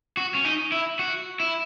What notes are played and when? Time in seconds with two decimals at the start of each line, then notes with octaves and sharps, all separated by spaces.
0.17 F#4
0.35 C#4
0.45 D#4
0.72 E4
0.99 F#4
1.40 E4